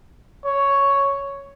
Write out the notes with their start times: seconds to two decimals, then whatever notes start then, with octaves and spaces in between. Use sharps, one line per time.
0.45 C#5